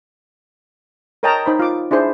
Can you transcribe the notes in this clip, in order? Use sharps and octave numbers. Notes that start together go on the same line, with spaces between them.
A#4 C#5 D#5 G5 A5 A#5
D#4 C5 B5
F4 D6
D4 E4 G#4 C5